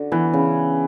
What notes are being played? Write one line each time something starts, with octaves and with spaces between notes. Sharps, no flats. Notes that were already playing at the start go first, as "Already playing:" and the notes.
Already playing: D3 F#4
E3 B3
C#3